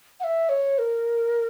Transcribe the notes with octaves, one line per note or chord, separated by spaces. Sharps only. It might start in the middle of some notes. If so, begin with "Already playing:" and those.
F#5
E5
C#5
A#4